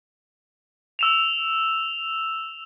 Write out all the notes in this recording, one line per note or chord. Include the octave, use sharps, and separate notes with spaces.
E6 E7 F7